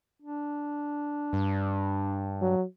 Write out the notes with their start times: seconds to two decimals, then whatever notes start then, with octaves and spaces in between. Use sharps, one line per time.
0.22 D4
1.33 G2
2.42 F#3